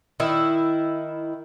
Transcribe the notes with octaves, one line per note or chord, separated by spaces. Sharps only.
D#3 E4